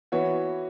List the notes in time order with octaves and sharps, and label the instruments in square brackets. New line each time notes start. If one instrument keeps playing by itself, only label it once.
[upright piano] E3 B3 F#4 C#5